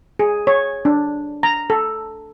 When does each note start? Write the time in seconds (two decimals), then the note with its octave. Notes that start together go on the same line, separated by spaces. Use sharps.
0.19 G#4
0.47 C#5
0.85 D4
1.43 A#5
1.70 A4